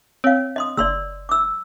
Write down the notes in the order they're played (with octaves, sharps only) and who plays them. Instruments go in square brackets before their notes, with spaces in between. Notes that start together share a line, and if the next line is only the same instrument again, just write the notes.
[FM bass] C4 [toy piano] C#5 F5
[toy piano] D#5 C6 D#6
[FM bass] F#1 [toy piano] D5 C6 E6
[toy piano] D6 E6